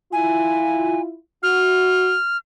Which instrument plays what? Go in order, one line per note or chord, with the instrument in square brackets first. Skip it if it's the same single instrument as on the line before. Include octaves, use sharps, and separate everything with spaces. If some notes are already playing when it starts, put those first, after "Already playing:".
[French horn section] E4 F4 [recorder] G#5
[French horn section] F#4 [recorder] F6